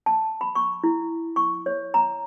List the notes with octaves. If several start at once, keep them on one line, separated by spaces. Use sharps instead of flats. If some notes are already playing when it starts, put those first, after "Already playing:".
A5
B5
C#6
E4
C#6
C#5
A#5